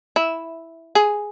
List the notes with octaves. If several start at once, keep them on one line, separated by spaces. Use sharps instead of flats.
E4
G#4